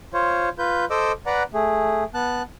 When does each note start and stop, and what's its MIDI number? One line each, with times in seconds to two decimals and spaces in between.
0.14 0.49 65
0.14 0.49 72
0.14 0.49 73
0.58 0.85 65
0.58 0.85 71
0.58 0.85 91
0.90 1.12 69
0.90 1.12 72
0.90 1.12 75
0.90 1.12 86
0.90 1.12 88
1.26 1.43 71
1.26 1.43 74
1.26 1.43 78
1.26 1.43 82
1.54 2.04 57
1.54 2.04 68
2.14 2.42 59
2.14 2.42 81
2.14 2.42 90